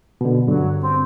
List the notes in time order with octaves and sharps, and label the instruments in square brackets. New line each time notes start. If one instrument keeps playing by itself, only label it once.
[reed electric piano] B2 D3
[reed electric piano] G2 D3 [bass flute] F#3
[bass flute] C4